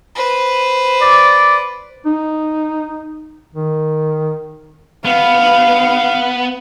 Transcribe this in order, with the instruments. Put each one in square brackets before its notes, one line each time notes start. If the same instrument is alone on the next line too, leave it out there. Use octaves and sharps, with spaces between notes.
[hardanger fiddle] B4 C5
[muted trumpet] D5
[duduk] D#4
D#3
[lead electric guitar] B3 [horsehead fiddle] F5